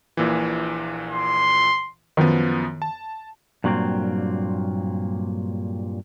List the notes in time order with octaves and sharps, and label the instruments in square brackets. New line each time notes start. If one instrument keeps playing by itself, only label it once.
[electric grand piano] A#1 A#2 E3
[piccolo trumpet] C6
[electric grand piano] F#2 F3 B3 [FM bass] D#3
[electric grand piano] A5
[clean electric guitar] G2 A#2 F#3 A#3 C4